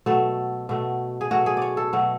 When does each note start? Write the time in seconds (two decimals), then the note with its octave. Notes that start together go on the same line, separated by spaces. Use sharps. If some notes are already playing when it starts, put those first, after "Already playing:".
0.06 B2 F#3 A3 A4
0.69 B2 F#3 A3
1.21 G#4
1.31 B2 F#3 A3 F#4
1.46 G#4
1.57 C#5 D5
1.77 A4
1.93 B2 F#3 A3